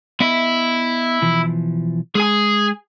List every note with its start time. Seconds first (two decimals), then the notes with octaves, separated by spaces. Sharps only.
0.20 B3 E4 D#5 E5
1.22 B2 E3 F3
2.15 G#3 G#4 G#5